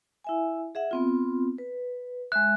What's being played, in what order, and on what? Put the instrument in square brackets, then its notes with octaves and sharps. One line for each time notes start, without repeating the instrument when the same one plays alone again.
[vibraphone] E4 E5 G#5
G#4 E5 F#5
B3 C4 F4
B4
[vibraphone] G#3 E5 [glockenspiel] F#6